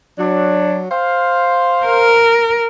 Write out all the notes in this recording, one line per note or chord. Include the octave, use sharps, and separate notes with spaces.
F#3 D4
C5 F5
A#4